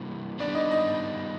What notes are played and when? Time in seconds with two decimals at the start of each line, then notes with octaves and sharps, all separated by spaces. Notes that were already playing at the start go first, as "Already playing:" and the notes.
Already playing: C3 E3 G3 A#3
0.39 D#3 G3 B3 D4 D5
0.55 D#4 D#5
0.70 D#4 D#5